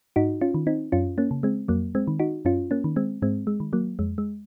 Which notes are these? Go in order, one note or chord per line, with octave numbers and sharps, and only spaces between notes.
G#2 D#4 F#4
C#4 F4
D#3
C4 D#4
F#2 C#4 F4
A#3 C#4
C#3
G#3 C4
F2 F#3 A#3
G#3 C4
D#3
D#4 F#4
F#2 C#4 F4
A#3 C#4
D#3
G#3 C4
G#2 G#3 C4
G#3
D#3
F#3 A#3
F2 G#3
G#3